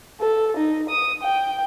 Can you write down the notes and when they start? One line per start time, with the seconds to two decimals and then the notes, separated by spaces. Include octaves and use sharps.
0.21 A4
0.57 D#4
0.89 D#6
1.23 G5